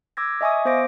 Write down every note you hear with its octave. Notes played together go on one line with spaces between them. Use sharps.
D6 E6 G#6 A#6
D#5 E5 G#5 C#6 D#6
B3 C5 F5 D6 A#6 D7